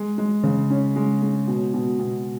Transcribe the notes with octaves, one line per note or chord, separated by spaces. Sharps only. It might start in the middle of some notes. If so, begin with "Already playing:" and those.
Already playing: G#3
G#3
C#3
C#4
G#3
G#3
B2
B2
B2